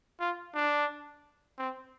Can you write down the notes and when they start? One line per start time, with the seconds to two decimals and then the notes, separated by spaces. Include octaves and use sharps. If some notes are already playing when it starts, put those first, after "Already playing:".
0.20 F4
0.54 D4
1.58 C4